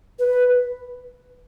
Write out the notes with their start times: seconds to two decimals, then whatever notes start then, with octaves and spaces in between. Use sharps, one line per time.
0.19 B4